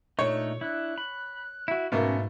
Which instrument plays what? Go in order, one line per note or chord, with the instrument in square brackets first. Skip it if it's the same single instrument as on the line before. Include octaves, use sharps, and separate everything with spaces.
[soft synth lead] A#2 [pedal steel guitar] A3 D4 D#4 [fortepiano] C#5
[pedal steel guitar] D4 E4 [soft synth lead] F#6
[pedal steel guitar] B5
[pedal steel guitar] E4 F#4 [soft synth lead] E5
[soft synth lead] G#2 [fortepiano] B2 A3 A#3 [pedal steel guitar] C#4